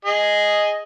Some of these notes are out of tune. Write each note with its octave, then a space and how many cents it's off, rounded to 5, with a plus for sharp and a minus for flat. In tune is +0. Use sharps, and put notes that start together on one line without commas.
G#4 +0 D#5 +0